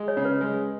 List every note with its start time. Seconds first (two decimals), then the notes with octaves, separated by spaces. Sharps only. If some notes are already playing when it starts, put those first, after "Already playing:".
Already playing: G#3
0.08 C#5
0.17 C#3
0.25 B4
0.41 G#3